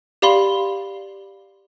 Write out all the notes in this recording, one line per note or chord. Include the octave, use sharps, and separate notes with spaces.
G4 D5 F5 B5 C6 G7